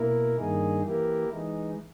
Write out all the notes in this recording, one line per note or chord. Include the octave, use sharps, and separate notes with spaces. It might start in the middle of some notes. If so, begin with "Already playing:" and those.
Already playing: B2 A#3 E4 A#4
G2 D#3 A#3 D#4 G#4
E3 A#3 E4 G4 A#4
E3 G#3 D#4